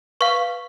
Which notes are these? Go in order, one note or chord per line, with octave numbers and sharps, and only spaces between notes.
B4 F5 C#6